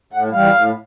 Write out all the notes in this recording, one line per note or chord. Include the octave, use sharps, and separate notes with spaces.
A2 F#5
E3 G3 F5
A2